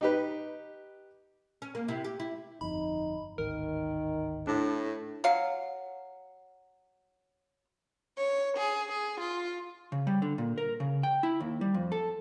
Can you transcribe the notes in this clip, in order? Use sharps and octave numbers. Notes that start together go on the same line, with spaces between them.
D#4 G4 B4
C#4
A#3
C3 E4
G4
E4
G1 F2 D#4 B5
D1 G#1 D#3 A#4
A2 D4
F#3 F5
C#5
G#4
G#4
F4
C#3
G3
D3
A#2
A#4
C#3
G5
E4
D#2
G3
F2
A4